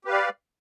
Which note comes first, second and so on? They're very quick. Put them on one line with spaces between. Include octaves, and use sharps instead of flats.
G4 B4 F5 D5